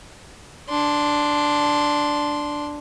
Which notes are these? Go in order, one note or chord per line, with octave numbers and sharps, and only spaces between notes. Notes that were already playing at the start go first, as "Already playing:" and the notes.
D4 C6